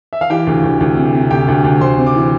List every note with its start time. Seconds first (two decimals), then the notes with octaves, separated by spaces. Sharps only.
0.13 E5
0.21 F5
0.30 E3 G4 G5
0.47 D2
0.64 D2
0.80 D2
0.97 C3
1.14 C3
1.31 D2 G4 G5
1.48 D2
1.65 D2
1.81 D2 C5 C6
1.98 C3
2.06 D6
2.15 E3